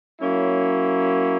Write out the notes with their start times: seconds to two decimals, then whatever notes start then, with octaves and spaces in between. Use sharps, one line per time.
0.20 F#3 A#3 C#4 E4